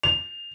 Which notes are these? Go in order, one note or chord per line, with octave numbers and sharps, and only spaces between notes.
F7